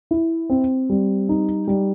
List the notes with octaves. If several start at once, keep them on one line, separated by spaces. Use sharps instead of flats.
E4
C4
G3
D#4
G3